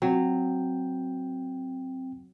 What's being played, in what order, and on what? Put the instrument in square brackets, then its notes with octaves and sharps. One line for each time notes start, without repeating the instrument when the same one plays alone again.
[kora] F#3 [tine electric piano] C4 G5